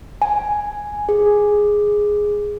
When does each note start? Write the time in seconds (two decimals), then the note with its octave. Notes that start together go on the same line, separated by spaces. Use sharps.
0.22 G#5
1.09 G#4